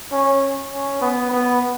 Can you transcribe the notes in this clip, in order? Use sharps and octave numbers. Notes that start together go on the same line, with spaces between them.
C#4
C#4
B3
B3